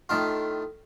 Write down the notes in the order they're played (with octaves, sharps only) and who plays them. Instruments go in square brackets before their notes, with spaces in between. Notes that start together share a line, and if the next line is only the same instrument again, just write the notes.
[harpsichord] A2 D#3 F4